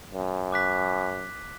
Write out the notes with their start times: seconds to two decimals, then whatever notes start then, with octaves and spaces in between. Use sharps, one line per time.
0.13 F#2
0.52 D6 F#6 B6